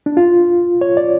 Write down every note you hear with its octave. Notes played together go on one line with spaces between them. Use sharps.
D4
F4
C#5
D5